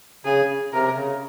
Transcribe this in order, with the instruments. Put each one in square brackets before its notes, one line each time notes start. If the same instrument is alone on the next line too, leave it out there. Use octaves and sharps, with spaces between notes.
[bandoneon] C#3 [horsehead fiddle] G#4
[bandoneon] C3 [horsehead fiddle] A#4
[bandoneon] C#3